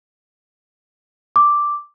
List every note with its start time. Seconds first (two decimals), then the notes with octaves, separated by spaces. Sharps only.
1.36 D6